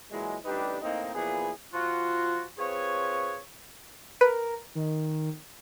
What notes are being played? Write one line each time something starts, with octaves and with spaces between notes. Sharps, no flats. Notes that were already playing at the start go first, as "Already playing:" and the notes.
A#2 E3 F#3 G#3
A1 G3 D4 D#4 G4 B4
A2 A#3 C4 D#4
A#2 E3 F3 B3 G#4
F3 F4 F#4
C4 F4 G#4 B4 C#5
A#4 B4
D#3